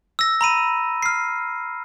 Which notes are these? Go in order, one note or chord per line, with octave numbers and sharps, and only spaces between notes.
E6 A#6
A#5 B5 D#7
F6 C7